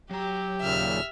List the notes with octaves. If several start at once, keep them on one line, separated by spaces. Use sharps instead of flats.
F#3 G4 A#5
D#2 A#2 C#3 E5 F6